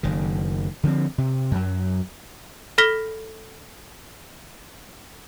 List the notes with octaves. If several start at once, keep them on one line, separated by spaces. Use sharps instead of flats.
F#1 D#3
D3 F3 A3 C4
C3
F#2 F#3
A4 B5 F6 A#6 B6 G7